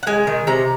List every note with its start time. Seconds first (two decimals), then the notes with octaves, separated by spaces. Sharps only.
0.03 F#5
0.07 G#3 G#5
0.27 D#3
0.47 C3 A#5